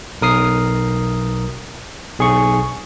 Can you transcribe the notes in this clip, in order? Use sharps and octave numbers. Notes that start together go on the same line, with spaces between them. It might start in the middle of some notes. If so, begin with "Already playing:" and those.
B1 A#4 D#6 C7
B1 G#4 C#6